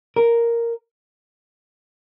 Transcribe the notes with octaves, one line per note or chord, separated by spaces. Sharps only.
A#4